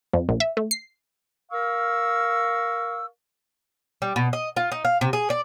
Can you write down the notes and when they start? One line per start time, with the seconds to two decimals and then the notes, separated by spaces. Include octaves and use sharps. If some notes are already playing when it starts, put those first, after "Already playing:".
0.13 F2
0.29 A#1
0.40 E5
0.57 A3
0.71 C7
1.52 A#4 F5 C#6 E6
4.02 G3
4.16 B2
4.33 D#5
4.56 F4
4.72 D#4
4.85 F5
5.01 C3
5.13 G#4
5.30 D5